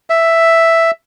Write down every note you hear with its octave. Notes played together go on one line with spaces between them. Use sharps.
E5